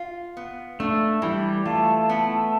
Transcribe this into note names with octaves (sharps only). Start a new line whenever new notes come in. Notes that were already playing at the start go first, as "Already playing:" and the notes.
Already playing: F4
B3
A3 D4
E3 G3
A3 F4
B3